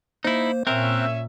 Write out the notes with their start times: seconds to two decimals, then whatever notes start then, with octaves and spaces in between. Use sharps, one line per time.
0.24 A#3 D#4 E4 C5
0.67 A#2 C4 C#4 A#4 E5 F#6